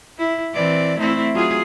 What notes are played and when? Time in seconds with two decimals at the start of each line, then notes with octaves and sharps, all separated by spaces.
0.18 E4
0.53 E3 C4 D5
0.98 A3 C4 E4
1.34 F#3 F4 G#4